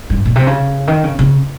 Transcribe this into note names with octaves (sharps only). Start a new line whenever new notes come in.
G2
A#2
C3
C#3
D#3
C#3
C#3